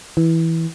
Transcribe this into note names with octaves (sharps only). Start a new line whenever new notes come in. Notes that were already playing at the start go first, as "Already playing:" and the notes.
E3